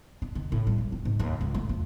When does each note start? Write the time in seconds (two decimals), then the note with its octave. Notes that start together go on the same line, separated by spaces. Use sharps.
0.22 D4
0.35 D#3
0.52 A2
0.67 G3
0.78 G#1
0.92 C4
1.05 G#2
1.20 D#2
1.41 C#2
1.54 A3
1.69 F2